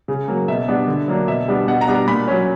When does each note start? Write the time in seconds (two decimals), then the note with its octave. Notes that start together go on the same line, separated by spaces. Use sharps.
0.08 C#3
0.28 F#3 A#3
0.48 B2 E5
0.68 G3 B3 D4
0.88 D3
1.08 F#3 A#3 D4
1.28 B2 E5
1.48 G3 B3 D4
1.68 B2 F#5
1.81 A#5
1.88 G3 B3 D4
1.94 A#5
2.07 A#2 B5
2.28 F#3 C#4